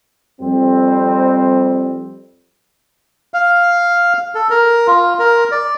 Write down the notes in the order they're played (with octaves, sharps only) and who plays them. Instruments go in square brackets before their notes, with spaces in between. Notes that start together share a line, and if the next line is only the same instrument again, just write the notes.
[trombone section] F2 G3 C4
[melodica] F5
A4
A#4
F4
A#4
D5